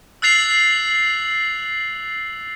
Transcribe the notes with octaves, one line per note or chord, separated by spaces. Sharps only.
E6 F#6 A6 C7 F7 F#7